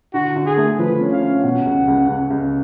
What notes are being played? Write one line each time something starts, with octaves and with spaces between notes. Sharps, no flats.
D3 F#4
D3
G#4
A3
F3 B4
C#4
F5
C#4
B2 F#5
C#2
C#2
C#2
C#2